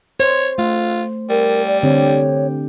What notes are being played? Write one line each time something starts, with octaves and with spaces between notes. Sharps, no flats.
C5 C#5
A3 F4
G3 A#4
D5
D3 C4 G4 C#5